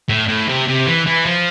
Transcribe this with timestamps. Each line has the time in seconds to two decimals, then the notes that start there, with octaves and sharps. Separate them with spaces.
0.09 A2
0.28 A2
0.49 C3
0.68 C3
0.87 E3
1.07 E3
1.26 F3